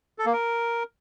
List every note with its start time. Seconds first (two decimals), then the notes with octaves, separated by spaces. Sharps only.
0.19 A4
0.26 A#3
0.33 A#4